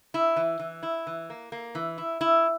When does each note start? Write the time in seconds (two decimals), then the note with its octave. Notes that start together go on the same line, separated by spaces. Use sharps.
0.14 E4
0.36 E3
0.59 E3
0.83 E4
1.07 E3
1.30 A#3
1.52 A#3
1.75 E3
1.98 E4
2.21 E4